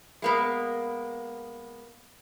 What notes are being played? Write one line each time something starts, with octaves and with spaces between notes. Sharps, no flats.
G#3 A#3 B3